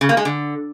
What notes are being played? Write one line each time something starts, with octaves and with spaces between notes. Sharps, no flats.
C#3
A#3
G#3
D3